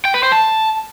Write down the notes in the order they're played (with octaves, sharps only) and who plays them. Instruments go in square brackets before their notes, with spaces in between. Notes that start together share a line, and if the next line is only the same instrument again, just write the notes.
[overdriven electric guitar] G5
B4
C5
A5